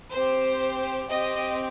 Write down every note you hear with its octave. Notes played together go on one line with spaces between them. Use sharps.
C4 G4 C5
C4 G4 D#5